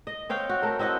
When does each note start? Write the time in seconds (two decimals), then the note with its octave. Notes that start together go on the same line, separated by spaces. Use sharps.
0.07 D#5
0.29 C4 C#5 F5 G5
0.49 F#4
0.62 A3 A#4
0.79 C4 E4 D#5 F#5